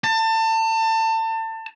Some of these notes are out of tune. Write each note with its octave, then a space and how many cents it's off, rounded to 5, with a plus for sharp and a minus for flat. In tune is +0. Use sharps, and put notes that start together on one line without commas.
A5 +30